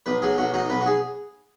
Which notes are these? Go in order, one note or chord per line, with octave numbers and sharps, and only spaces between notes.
B1 B4
F#3 G#4
B1 F#4
F#3 D#4
B1 B4
F#4
G#4